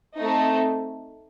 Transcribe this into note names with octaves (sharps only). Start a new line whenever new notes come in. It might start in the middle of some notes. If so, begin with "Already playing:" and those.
A3 C4 D#4